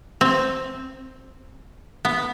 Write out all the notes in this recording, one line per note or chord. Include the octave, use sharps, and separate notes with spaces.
C4
B3